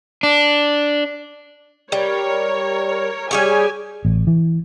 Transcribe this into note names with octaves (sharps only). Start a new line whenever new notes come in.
D4
G3 A#4 C#5
G3 G4 G#4 C#5 G#5
A1
E3